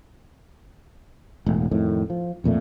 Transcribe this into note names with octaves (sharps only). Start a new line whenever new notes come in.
E1 A2
F2 A2 D#3
F3
B1 F2 A#2 A3